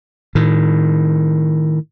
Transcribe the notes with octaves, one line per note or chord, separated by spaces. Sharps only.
A2 D#3